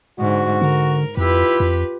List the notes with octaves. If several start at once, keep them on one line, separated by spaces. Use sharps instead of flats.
G#2 D3 F#4
D3 A#4
F2 E4 F4 G4 B4
F2